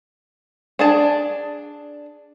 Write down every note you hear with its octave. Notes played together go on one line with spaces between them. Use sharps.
D4 G#4 A5